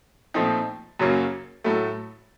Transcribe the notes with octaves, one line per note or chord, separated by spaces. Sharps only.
A#2 F3 A3 C4 D#4
F#2 C#3 F#3 A#3 C#4
A2 F#3 A3